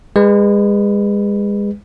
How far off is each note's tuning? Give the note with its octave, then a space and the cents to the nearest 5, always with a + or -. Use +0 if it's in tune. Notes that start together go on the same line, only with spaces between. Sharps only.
G#3 -30 B4 +0